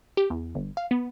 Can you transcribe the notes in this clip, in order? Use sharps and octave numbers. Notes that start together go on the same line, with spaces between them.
G4
E2
G1
F5
B3